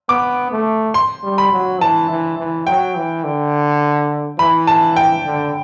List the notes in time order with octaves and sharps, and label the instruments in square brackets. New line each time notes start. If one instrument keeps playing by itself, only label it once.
[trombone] B3 [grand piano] D6
[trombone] A3
[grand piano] C6
[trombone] G3
[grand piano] B5
[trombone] F#3
[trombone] E3 [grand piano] A5
[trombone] E3
E3
[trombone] F#3 [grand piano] G5
[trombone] E3
D3
[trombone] E3 [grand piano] B5
[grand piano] A5
G5
[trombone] D3